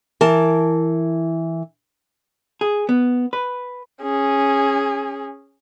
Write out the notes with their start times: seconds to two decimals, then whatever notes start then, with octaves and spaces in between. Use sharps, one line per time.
0.21 E3 A#4 A5
2.61 G#4
2.89 B3
3.33 B4
4.02 C#4 G#4